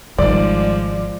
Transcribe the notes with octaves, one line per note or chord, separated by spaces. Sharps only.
G#1 D#3 F3 G3 G#3 D5